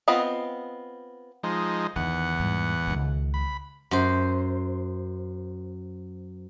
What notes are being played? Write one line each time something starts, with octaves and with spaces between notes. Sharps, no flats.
B3 C4 F4 D#5 B5
F3 G#3 D#4
E2 D#3 F#5
G#2 G3
C#2 D#3
B5
F#2 C5